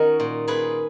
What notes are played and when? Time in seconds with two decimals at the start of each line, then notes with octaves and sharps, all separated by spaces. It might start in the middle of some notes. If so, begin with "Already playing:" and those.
Already playing: D#3 C#4 D#4 F#4 A#4
0.20 A#2
0.47 A#2 G#4 B4